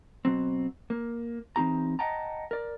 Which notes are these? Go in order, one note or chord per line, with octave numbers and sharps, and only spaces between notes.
B2 F#3 C4
A#3
E2 E3 C4 D#4 G4 A#5
D#5 F#5 G5 A5 A#5
A#4 D5